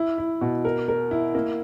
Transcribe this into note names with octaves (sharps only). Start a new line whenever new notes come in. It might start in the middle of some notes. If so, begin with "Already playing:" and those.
Already playing: E4
E4
B2
A#4
A#4
E4
A#3